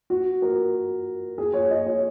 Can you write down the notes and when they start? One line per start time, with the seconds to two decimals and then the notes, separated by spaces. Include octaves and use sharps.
0.10 F#4
0.42 A#4
1.38 G#4
1.53 C#5
1.71 D#5
1.87 C#5